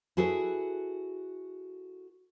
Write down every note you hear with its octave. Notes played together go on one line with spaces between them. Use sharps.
E4 F#4 G#4 A4 B4